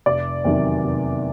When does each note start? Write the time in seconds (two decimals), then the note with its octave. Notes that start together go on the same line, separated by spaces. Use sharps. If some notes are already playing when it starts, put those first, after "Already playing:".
0.06 F1 D5
0.45 E2 C3 D#3 F#3
0.84 F1